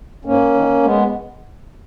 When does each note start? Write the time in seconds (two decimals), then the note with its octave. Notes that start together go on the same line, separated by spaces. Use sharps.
0.25 G#2 A#3 C#4
0.54 D#3
0.83 G#3 B3